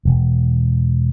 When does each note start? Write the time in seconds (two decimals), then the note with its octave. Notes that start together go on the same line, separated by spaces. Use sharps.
0.05 E1